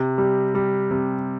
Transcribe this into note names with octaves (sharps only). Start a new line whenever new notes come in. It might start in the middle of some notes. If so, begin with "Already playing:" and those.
Already playing: C3
G3
G3
C3